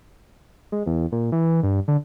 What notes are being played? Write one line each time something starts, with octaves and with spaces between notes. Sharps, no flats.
G#3
E2
A#2
E3
G2
D3